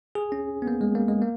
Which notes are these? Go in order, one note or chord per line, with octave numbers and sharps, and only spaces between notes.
G#4
C#4
B3
A#3
G#3
A#3
G#3
A#3